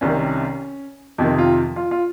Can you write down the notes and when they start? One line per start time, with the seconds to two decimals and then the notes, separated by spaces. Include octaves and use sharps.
0.01 C2 C3 D#3 C#4
1.18 F2 C3 D#3 D#4
1.38 F4
1.76 F4
1.91 F4